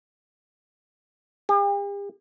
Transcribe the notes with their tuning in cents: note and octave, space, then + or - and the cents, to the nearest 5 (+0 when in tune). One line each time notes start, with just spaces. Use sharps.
G4 +45